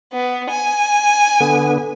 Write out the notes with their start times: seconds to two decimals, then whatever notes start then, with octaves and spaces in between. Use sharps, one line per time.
0.13 B3
0.50 G#5
1.40 D3 B3